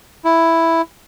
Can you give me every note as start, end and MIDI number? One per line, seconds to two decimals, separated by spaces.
0.25 0.82 64